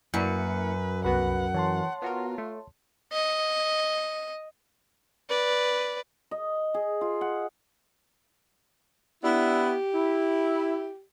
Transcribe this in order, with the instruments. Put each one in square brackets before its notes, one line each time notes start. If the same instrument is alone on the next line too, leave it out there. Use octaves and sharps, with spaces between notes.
[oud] F#2 [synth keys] A#3 E4 C#7 [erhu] B4
[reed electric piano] C2 B5 [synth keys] B3 F#4 B4 [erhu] F#5
[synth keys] E3 [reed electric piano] C#5 A5 C6
[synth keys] B3 F#4 A#4 [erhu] F4
[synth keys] A3
[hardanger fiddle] D#5
B4 D5
[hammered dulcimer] D#5
G#4
F4
F#5
[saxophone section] B3 D4 E4 [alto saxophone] G4
[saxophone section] E4